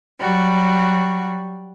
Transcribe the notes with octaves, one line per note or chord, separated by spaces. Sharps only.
F#3 G3 F#4